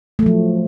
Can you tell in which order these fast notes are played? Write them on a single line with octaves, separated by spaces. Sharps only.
A3 F#3 F3